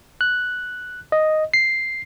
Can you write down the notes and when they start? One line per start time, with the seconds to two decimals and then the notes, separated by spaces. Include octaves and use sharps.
0.21 F#6
1.12 D#5
1.54 C7